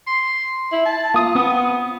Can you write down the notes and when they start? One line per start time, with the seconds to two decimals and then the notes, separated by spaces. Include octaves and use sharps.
0.07 C6
0.72 E4
0.85 A5
1.14 A#3 F4 D#6
1.35 B3 C4 D#6